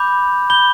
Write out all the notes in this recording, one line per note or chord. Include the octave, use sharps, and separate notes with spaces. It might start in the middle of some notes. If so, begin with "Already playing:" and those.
Already playing: B5 D6 G6
B5 G6 G7